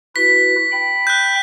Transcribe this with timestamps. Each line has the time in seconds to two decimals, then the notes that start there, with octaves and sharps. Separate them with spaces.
0.16 E4 F#4 B4 B6
0.72 G5 B5
1.07 F#6 G6